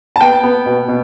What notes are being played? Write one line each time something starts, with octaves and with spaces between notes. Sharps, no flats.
A5
B3 G5
B3
B2
B2